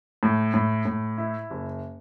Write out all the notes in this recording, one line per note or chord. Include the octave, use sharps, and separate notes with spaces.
A2
A2
A2
E4
F#1